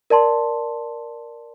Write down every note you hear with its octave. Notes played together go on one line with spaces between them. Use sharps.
A#4 D5 A5 C6